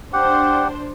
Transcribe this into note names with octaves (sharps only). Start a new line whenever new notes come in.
D4 G4 C5 F#5